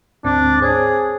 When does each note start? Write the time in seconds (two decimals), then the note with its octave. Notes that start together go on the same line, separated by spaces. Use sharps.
0.24 D2 G#2 C4 D4
0.62 G#4 C5 C#5